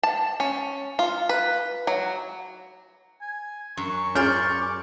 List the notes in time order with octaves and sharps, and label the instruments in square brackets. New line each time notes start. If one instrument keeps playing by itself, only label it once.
[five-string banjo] A5
C#4
F4
B4
F#3
[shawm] G#5
[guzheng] F#2 [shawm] C#6
[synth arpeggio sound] C#4 F4 G#4 [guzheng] C5 D5 [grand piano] F6 G6
[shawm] D6